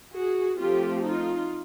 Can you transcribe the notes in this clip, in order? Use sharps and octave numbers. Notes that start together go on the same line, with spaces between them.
F#4 G#4
F3 A3 C4 F4 G4
D#4 F4